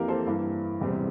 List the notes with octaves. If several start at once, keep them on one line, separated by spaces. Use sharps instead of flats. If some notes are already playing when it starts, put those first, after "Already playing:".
Already playing: F2 E3 A#3 G4 A#4
A4 C5
G2 E3 A#3
E1 E2 C3 G3 C4